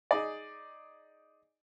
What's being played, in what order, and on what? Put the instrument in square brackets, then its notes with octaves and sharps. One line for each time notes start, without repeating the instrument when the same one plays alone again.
[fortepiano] D#4 G#4 D5